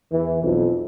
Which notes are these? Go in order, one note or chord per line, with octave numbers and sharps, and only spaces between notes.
E2 E3
B1 F2